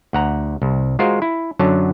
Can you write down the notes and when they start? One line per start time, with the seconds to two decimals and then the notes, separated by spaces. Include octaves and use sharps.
0.13 D2 F#5 A#5
0.62 C2
0.99 G#3 F4 F#4 A#4 C5
1.22 E4
1.59 F#2 D3 F#3 C#5 A5